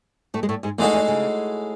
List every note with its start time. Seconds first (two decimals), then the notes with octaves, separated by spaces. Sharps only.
0.34 A2 A3
0.43 G#3
0.49 A2 A3
0.63 G#2 G#3
0.78 E2 A2 E3 G#3 D#4 F#4 A4
0.93 E2 E3
1.08 C#3